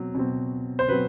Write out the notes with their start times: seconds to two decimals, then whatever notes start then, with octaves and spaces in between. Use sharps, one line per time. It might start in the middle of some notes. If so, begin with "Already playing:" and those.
Already playing: B2 F#3 C4
0.15 B2 F#3 C4
0.79 C5
0.88 B2 F#3 C4 B4